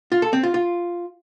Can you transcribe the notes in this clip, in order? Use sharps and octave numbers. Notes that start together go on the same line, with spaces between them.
F4
A4
C4
F4
F4